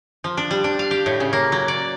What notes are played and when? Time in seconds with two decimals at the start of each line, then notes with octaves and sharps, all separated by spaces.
0.24 F3
0.37 D4
0.51 G3
0.64 D4
0.79 F5
0.91 G4
1.06 A2
1.20 C#3
1.33 A#3
1.52 F#3
1.68 D5